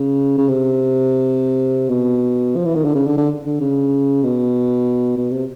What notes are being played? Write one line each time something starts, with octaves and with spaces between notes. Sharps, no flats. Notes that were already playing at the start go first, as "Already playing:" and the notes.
Already playing: C#3
C#3
C3
B2
F3
E3
D#3
D3
C#3
D3
D3
D3
C#3
B2
B2
C3